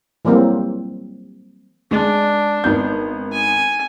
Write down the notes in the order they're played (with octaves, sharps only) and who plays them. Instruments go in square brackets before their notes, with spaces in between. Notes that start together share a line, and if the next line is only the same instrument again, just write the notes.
[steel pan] E3 F#3 G3 A#3 C4
[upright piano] G#3 [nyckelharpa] D4
[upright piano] G#1 B3 G6
[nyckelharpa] G#5